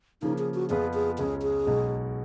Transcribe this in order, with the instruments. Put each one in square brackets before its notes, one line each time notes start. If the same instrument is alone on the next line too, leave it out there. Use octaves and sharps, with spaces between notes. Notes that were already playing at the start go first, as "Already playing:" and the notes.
[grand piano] C#3 F3 A#3 [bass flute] D#4
[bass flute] G#4
F#4
[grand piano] F2 F3 B3 F4 B4 [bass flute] G#4
[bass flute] G#4
[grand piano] C#2 C#3 G#3 C#4 [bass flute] G#4
[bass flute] G#4
[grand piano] B1 B2 G#3